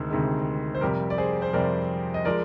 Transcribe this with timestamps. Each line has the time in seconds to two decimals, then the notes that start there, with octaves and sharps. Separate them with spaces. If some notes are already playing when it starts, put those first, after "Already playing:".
Already playing: D2 C3 D#3 G#3
0.10 D2 C3 D#3 G#3
0.75 C5
0.81 F2 C3 G3 G4 A#4
1.10 D5
1.18 G#4 C5
1.42 C5
1.53 F2 C3 G3 A#4 D5
2.14 D#5
2.25 F3 G#3 A#4 D5